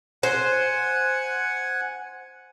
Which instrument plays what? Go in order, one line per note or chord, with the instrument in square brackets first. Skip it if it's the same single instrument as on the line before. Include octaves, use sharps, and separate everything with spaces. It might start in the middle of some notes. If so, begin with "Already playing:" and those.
[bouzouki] C5 [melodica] F#5 G#5